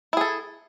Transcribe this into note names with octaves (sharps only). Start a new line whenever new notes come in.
E4 G#4 A4